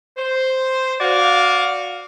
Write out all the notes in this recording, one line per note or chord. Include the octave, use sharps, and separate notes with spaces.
C5
F#4 D5 F5